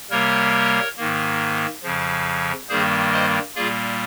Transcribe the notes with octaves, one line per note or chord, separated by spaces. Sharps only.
C3 G3 A#3 A#4 C#5
G#2 D#3 A#3
F2 C#3 F3
G2 D#3 G3 A#3 G#4 C5
C5 D#5
A#2 G3 A#3 F4 G#4